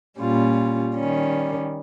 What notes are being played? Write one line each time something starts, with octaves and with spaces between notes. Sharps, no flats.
A#2 G3 C#4 F4
D#3 G3 C#4